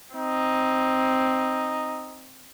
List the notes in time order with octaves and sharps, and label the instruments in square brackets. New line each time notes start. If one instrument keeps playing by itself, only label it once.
[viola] C4 [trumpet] D#4